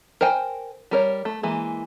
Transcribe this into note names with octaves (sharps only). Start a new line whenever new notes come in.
A#4 C5 G5 G#5
G3 A#4 C#5
A3
E3 G#3 A#3